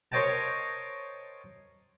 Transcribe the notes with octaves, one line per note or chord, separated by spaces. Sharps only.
A#4 C5 C#5 D#5 G5 A5